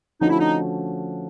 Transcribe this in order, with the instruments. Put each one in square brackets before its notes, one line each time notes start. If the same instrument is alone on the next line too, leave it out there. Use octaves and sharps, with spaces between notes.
[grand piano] D3 F3 A3 C#4 F#4 [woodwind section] D#4
[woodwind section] E4
D#4